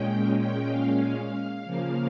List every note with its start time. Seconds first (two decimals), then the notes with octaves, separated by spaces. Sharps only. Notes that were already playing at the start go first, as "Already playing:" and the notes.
Already playing: A#2 G#3 C#4 G5
0.40 G5
0.71 F5
1.66 C#3 F3 A#3